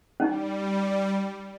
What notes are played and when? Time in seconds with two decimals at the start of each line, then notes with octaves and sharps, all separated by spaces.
0.20 G3 C#4 D#4